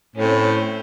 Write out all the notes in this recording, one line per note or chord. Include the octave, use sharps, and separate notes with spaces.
A2 C4 C#4